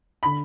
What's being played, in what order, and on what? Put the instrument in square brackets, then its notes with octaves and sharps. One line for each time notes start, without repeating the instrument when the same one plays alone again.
[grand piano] D3 [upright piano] B5